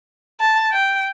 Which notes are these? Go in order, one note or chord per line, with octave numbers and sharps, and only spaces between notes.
A5
G5